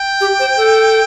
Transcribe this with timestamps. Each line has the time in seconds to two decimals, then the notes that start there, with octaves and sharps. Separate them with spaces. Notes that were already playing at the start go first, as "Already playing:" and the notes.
Already playing: G5
0.21 G4
0.40 C5
0.57 A4